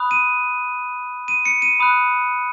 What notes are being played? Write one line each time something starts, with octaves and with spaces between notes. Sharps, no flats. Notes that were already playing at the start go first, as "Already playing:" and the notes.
Already playing: B5 D#6 F#6
D#7
D#7
C#7
D#7
B5 D#6 F#6